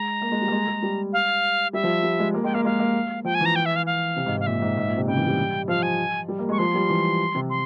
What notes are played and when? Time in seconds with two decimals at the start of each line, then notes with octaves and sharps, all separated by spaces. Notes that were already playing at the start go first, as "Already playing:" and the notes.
Already playing: G#3 A#5
0.21 A#3
0.32 G#3
0.42 G3
0.48 A#3
0.52 G#3
0.67 G#3
0.83 G3
1.13 F5
1.73 G3 E5
1.83 F3
2.03 G3
2.19 G#3
2.34 A#3
2.44 G#3 G5
2.54 A#3 F5
2.65 G#3 F5
2.79 A#3
3.24 F3 G5
3.35 G#5
3.41 E3 A#5
3.56 G5
3.66 E5
3.76 F5
3.86 F5
4.16 C3
4.26 G#2
4.36 G#2 F5
4.46 A#2 E5
4.62 G#2
4.77 G#2
4.87 A#2
4.97 C3
5.07 C#3 G5
5.17 E3
5.27 G3
5.68 F3 F5
5.83 G#5
6.28 G3
6.39 A#3
6.49 G#3 C#6
6.58 F3 C6
6.74 G3
6.89 E3
7.35 C3
7.50 C6